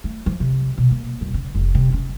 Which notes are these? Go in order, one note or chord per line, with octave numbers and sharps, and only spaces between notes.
A3
F3
C3
B2
A#3
D#1
C#3
F1
C3
C#4